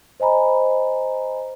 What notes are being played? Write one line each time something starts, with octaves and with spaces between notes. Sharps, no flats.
C5 D#5 G#5 A#5 B5